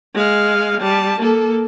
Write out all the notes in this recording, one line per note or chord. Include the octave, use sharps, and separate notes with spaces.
G#3 F5
G3 A5
A#3 A4